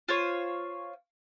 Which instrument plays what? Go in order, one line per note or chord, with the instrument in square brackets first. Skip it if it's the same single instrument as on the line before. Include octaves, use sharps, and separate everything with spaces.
[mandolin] F4 C5 C#5